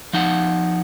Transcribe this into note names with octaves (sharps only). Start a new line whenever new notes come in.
F3 D#4 F#5